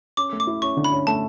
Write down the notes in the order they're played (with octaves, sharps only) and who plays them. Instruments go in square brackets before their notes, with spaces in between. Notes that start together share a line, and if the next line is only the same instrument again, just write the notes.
[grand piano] C#4 [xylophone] D6
[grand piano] A3
[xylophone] D6
[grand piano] E4
[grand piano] C#4 [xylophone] C#6
[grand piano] D3
[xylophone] B5
[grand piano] C#4
[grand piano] A3 [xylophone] A5